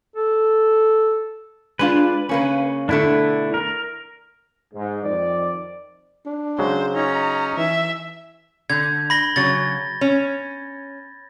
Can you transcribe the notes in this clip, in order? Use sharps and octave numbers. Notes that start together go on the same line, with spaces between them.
A4
G#3 D4 F4 B4
C#3 A#3 C#4
B2 D3 A3 D4 E4
A#4
G#2
F2 D#3 D5
D4
C#3 F#3 G#3 C5
C#4 D#4 A#5
E3 E5
D3 G6 G#6
B5 A#6 G7
C#3 F#3 A6
C#4